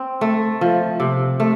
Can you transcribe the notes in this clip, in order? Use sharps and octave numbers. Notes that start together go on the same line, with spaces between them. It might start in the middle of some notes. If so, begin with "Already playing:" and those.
Already playing: C4
A3
F3
C3
A3